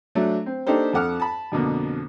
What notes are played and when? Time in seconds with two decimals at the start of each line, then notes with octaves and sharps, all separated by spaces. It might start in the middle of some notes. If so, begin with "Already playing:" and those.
0.15 F#3 A3 D4
0.46 C4
0.67 A#3 D4 D#4 G4 A4 C5
0.93 F2 A4 F#5 D6 F6
1.20 A5 B5
1.52 F2 B2 D3 A#3